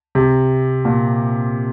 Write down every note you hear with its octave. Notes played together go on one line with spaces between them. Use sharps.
C3
A#2